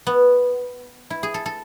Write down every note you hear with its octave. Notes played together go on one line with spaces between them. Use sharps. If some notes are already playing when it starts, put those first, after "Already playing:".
B3
E4
G#4
A4
A4